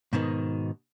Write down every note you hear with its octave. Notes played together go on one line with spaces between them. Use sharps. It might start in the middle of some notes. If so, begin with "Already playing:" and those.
G#2 B2 D#3